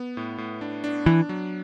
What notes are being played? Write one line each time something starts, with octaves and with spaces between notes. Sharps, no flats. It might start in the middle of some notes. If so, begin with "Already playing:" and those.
Already playing: B3
A2
A2
D4
D4
E3 D4
F#3